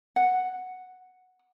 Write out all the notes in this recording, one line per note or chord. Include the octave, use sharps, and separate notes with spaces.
F#5